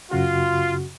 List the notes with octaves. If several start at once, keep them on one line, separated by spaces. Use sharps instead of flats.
F#2 C#3 F4 F#4